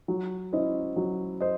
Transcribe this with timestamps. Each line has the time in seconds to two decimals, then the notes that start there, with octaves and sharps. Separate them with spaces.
0.08 F#3
0.53 C#4 E4 C5 D#5
0.96 F#3
1.41 C5 D#5